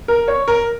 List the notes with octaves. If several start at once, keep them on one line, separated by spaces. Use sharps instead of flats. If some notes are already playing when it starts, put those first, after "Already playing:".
A#4
C#5
A#4